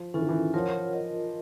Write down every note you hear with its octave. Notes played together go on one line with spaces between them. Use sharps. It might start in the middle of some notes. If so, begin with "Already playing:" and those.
Already playing: F3
E3 C#4 F4 A4
D#3
E3
F3 F4 A#4 C#5 F#5
F4 A#4 D#5